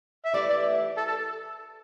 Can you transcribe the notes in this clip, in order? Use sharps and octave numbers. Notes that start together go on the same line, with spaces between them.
E5
E3 A3 E4 G4 D5
D5
A4
A4